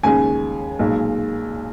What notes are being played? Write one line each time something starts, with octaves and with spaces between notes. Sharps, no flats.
D#2 C#3 G#3 G#5
B1 A#2 G#3